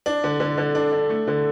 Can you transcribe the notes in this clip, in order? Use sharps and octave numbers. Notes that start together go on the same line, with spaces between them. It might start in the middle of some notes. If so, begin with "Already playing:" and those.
D4
D3
D3
D3
D4
D4
A3
D3